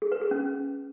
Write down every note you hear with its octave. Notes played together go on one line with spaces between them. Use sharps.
G#4
B4
G#4
C#4